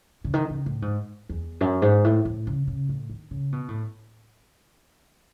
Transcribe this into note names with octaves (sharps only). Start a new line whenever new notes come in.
C#3
D#3
C#3
A2
G#2
E2
F#2
G#2
A2
A2
C#3
C#3
A2
D#3
C#3
B2
A2